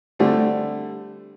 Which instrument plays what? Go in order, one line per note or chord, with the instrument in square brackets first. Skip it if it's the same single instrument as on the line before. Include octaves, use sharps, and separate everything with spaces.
[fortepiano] D3 G3 A3 C4